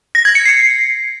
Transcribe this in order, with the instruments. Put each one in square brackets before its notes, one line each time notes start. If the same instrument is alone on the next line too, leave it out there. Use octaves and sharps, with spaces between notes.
[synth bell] A#6
G#6
C#7
C7